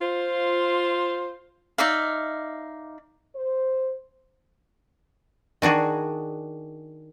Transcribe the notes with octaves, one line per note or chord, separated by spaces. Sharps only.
F4 C5
D#4 D5 E5 F5
C5
D#3 D4 F#4 G#4